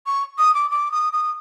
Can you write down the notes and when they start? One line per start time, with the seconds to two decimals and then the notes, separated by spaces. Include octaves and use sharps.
0.06 C#6
0.38 D#6
0.54 D6
0.70 D6
0.91 D#6
1.13 D#6